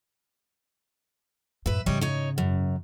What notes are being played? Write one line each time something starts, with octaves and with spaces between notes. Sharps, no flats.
F#2 A2 B4 E5
G#2 C#3 G3 C#5 D#5
D#4 C#5
F#2